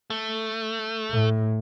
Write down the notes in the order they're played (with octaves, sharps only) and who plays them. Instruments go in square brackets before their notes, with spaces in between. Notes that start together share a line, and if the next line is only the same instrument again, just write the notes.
[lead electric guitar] A3
[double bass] A2